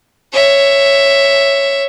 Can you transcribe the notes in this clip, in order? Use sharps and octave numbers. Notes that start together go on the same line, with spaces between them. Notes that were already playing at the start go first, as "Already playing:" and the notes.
C#5 E5